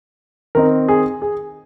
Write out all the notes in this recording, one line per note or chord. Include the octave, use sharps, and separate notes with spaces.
D#3 C4 D#4 A#4
G#4
G#4